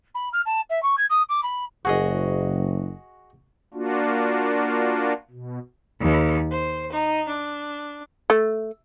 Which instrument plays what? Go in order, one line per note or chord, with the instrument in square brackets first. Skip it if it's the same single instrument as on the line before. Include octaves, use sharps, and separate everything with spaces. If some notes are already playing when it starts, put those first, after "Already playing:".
[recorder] B5
F6
A5
E5
C#6
G#6
D#6
D6
B5
[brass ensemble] F#1 [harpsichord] F#4 G#4 D#5
[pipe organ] A#3 D4 F4 F#4
B2
[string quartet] D#2
C5
D#4
D4
[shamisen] A3